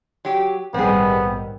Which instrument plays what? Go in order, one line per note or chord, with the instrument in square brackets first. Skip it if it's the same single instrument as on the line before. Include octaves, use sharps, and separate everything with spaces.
[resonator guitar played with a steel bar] F#3 G4
[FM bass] A#1 [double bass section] G#2 D#3 G3 [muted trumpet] B3 [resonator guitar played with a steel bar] C4 G#4